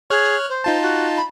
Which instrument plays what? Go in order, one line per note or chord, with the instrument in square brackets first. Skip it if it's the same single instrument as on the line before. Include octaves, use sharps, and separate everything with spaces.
[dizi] G#4 [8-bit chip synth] C#5 F6 F#6
[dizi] C5
[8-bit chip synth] D#4 F4 A5
[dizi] F#4
B5